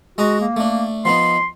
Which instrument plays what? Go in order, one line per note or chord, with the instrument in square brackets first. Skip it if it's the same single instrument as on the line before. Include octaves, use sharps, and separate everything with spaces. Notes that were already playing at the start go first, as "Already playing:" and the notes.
[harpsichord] G#3 D#5 A#5 [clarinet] F#4
[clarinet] A#3
[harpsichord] A3 D4
[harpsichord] F3 B3 D#4 [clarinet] C6